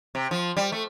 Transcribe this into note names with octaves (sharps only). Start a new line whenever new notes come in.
C3
F3
G3
A3